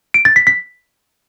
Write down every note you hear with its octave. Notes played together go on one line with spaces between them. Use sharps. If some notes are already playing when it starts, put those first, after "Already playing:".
D7
A6
B6
B6